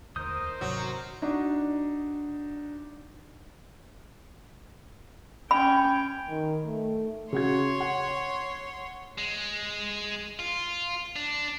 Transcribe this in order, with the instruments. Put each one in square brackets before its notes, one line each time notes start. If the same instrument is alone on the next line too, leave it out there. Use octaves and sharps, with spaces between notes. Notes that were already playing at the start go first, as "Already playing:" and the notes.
[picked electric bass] E1 D2 [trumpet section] D#4 A#4 C5 [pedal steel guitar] D#6 G6
[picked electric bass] G#1 C3 [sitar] F#3
[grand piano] D4 D#4 F#4
[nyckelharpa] C#4 G5 [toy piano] B5
[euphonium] D#3
A3
[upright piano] C#3 F#4 G#6 [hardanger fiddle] C#5 C6
[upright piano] F#5
[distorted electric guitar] G#3
F4
D4